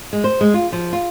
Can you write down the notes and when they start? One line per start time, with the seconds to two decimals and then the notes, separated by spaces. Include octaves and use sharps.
0.13 G#3
0.24 C5
0.41 G#3
0.54 F4
0.72 F3
0.93 F4